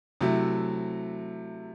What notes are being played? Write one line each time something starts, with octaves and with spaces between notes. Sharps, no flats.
C3 F#3 A3 E4